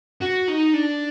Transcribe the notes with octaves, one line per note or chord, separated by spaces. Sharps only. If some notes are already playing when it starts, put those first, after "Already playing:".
F#4
D#4
D4